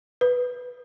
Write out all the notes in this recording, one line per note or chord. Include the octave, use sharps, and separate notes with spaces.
B4